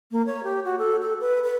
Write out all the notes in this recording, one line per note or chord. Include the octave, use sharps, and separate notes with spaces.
A#3
C#5
G4
F#4
A4
A4
B4
B4